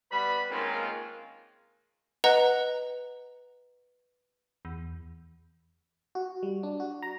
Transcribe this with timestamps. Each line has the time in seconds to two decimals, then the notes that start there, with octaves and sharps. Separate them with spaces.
0.11 G3 B3 B4 B5
0.50 D#3 G#3 A#3 C4 C#4 F4
2.24 B4 D#5 F#5 A#5
4.65 E2
6.15 F#4
6.43 G3
6.63 D4
6.80 F#4
7.02 A#5